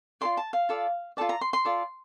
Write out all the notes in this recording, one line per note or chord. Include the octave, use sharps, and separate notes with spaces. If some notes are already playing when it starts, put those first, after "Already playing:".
F4 A4 D5 C6
A5
F5
F4 A4 D5
F4 A4 D5 A5
A#5
C6
C6
F4 A4 D5